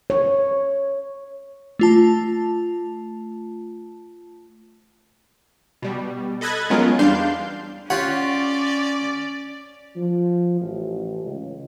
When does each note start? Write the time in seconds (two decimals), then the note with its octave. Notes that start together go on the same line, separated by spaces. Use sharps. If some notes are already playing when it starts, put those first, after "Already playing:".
0.10 C#5
1.79 A3 F4 A5
5.82 B2 G3
6.41 A4 D#5 B5 F#6 G#6 A6
6.70 F#3 G#3 B3 C#4 F4 A#4
6.99 E2 G3 D4 F5 C6 G6
7.90 C#4 F4 G4 C#5 D5 F#5
9.96 F3
10.61 A1
11.24 C#2